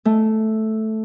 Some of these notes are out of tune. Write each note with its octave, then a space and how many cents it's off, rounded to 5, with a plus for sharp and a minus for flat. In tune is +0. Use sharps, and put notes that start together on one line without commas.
A3 -5